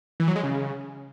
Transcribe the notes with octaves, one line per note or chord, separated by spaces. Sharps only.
E3
F#3
G#3
C#3